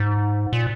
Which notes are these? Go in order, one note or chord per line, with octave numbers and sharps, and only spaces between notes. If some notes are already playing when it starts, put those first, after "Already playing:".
Already playing: G#2
A#2